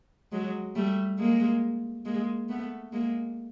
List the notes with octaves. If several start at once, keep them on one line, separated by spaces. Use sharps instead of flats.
F#3 G#3
G3 A3
G#3 A#3
G#3 A#3
A3 B3
G#3 A#3